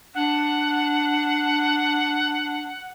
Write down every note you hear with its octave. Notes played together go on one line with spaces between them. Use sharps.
D4 F#5